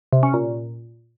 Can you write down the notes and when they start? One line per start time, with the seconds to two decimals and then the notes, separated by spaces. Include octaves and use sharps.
0.13 C3
0.23 C#4
0.33 A#2